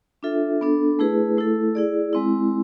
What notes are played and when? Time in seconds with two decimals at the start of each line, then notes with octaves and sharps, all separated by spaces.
0.23 D4 F4 A4 E5
0.61 B3 D4 A4
0.99 A3 E4 G#4 B4
1.37 A3 E4 A4
1.75 E4 G#4 D5
2.13 G#3 C4 E4